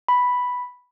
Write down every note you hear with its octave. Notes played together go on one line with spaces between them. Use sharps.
B5